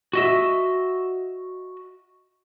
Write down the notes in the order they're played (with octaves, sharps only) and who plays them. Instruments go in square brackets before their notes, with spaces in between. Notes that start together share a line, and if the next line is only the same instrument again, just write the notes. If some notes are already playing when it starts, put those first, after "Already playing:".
[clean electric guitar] F#4 D#5 E5